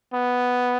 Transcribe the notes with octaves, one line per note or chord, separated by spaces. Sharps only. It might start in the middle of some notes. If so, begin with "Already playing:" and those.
B3